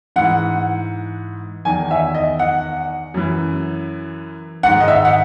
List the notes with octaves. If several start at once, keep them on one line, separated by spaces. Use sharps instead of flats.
G#2 E3 F#5
E2 D#3 G#5
E5
D#5
F#5
F#2 E3
G#2 D#3 F#5
D#5
E5
F#5